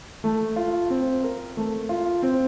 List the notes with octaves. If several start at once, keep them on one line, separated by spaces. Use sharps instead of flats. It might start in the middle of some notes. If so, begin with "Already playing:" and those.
A3
F4
C4
A#4
A3
F4
C4